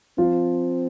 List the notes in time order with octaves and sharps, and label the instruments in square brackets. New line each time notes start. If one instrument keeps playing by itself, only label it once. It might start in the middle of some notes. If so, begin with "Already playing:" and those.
[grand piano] F3 F4 [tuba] C4